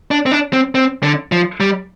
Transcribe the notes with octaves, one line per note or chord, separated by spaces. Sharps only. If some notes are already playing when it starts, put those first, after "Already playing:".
D4
C4
D4
C4
C4
D3
F3
G3